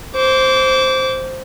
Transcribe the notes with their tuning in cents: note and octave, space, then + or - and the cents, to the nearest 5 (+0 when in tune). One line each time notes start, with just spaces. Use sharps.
C5 +0 D6 -30